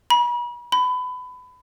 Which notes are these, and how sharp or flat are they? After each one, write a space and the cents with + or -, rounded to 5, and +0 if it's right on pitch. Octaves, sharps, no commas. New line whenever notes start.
B5 -40
B5 +25